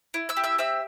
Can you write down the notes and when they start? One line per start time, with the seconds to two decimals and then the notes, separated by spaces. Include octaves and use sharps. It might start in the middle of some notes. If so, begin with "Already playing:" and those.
0.14 E4
0.29 E5 E6
0.37 G4
0.44 E5 E6
0.58 C4 E5 E6